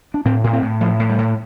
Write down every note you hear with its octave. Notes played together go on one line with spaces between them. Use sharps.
D4
A2 C4
A2
C4
A2
A2 F3
A2
G3
A2